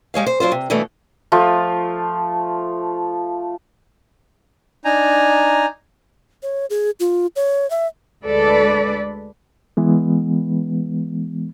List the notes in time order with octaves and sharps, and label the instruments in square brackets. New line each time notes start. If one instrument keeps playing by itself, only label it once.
[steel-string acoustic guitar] G3 G#3 C#5 F5
C5
F#3 D4 F4 C5
C3
G2 B2 E3 A3 B3 D4
[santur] F3 A3 F4
[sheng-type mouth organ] D4 D#4 G#5 A#5
[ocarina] C#5
G#4
F4
C#5
E5
[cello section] D2 G#3 A4 B4 D5
[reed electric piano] E3 G#3 B3